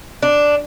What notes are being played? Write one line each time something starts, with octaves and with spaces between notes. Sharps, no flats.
D4